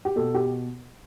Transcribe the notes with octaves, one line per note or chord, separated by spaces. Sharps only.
G4
B2 A4
G4